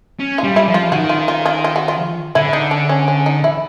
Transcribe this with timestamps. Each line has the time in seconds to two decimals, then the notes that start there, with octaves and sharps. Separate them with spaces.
0.20 C#4
0.38 F4
0.44 G3
0.56 E4
0.68 F3
0.74 F4
0.92 D#3 F#4
1.09 F4
1.28 F4
1.46 F4
1.64 F4
1.76 F#4
1.88 F4
2.35 D3 E4
2.53 D#4
2.71 D4
2.89 C#4
3.08 C#4
3.26 D#4
3.44 E4